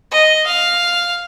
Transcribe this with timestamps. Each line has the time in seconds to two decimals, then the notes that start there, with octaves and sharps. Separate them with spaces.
0.11 D#5
0.47 F5